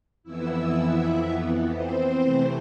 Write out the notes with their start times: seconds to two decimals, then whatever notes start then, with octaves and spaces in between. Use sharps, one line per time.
0.23 F2 E3 B3 E4 E5
1.73 C4 C5
2.22 C3 E3 A3